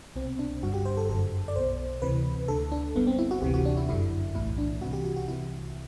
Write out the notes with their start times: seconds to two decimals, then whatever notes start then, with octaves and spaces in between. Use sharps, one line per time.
0.16 C2 B2 C4
0.39 D4
0.62 G1 G2 D3 F#4
0.74 G4
0.85 C5
0.97 A4
1.09 G1 F#2 D3 A4
1.48 D5
1.56 B1 B2 C5
2.02 D2 C3 E3 B4
2.48 D2 D3 A4
2.72 D4
2.95 G1 G2 D3 B3
3.07 C4
3.19 E4
3.31 F#4
3.42 D2 C3 E3 G4
3.54 F#4
3.65 D4
3.77 E4
3.88 G1 F#2 D3 E4
4.35 B1 A2 E3 E4
4.58 D4
4.81 C2 C3 E3 F#4
4.93 G4
5.04 F#4
5.16 F#4
5.28 C2 C3 E3 E4